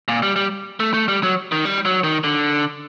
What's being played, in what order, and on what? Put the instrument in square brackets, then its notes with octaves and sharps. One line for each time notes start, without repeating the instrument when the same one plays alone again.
[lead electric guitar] A#2
G3
G3
A3
A3
G3
F#3
D#3
G3
F#3
D#3
D3